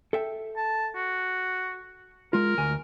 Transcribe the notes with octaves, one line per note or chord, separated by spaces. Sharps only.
A4 E5 G5
A5
F#4
G#3 F4 A#4
D2 G#5